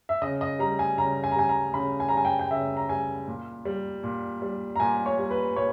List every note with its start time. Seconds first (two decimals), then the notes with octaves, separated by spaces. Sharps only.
0.09 E5
0.22 C#3 D#5
0.41 D#5
0.59 G3 A#5
0.79 G#5
0.98 C#3 A#5
1.24 G#5
1.31 A#5
1.36 G3 G#5
1.49 A#5
1.74 C#3 B5
2.00 G#5
2.09 A#5
2.13 G3 G#5
2.25 G5
2.39 G5
2.51 C#3 E5
2.77 A#5
2.89 G3 G#5
3.27 A#2
3.65 G3
4.03 A#2
4.42 G3
4.76 A#5
4.80 A#2 G#5
5.06 C#5
5.19 G3
5.31 B4
5.56 A#2 C#5